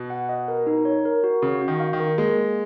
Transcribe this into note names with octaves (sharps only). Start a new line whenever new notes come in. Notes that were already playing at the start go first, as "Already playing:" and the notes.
Already playing: B2
F#5
D#5
A#4
D#4
C#5
A#4
F#4
C#3 F#4
F#4
D#3
F5
D#3
A#4
G#3 A#3
A#3